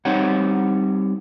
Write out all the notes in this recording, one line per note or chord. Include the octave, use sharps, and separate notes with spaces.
G3 C4 D#4 C#5 F#5